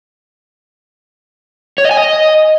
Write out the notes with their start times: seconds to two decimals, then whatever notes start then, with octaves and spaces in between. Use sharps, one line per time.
1.78 C#5
1.84 D#5
1.91 G#5
1.97 D#5